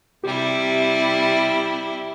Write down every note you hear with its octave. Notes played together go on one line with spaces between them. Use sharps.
C3 G3 E4 G4